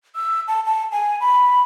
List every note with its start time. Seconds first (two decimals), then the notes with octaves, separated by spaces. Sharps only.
0.16 E6
0.48 A5
0.66 A5
0.92 G#5
1.20 B5